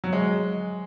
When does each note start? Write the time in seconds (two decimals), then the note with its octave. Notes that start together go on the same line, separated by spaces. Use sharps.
0.04 F#3
0.13 G#3